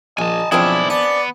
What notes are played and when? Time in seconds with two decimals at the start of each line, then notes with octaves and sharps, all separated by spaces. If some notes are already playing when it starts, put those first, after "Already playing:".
0.19 A#1 D#5 G#5 A5
0.52 B1 F2 C4 D4 E4 G#4 D5
0.90 B3 D5 A5